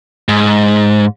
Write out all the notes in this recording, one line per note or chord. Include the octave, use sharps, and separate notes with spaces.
G#2